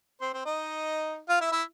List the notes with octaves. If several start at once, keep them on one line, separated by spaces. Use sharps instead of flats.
C4 C5
C4 C5
D#4 D#5
F4 F5
E4 E5
E4 E5